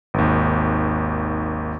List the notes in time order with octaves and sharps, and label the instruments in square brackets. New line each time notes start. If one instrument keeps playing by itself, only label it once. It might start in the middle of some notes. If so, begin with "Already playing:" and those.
[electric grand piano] G#1 D#2